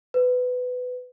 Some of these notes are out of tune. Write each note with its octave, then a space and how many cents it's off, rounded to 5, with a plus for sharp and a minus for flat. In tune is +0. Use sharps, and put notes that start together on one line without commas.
B4 +20